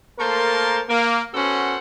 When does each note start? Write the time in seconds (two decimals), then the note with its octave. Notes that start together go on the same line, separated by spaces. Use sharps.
0.19 A3 A#3 A#4 C5 A5 C6
0.89 A#3
1.34 B3 C#4 F#4 A4 C5 F#5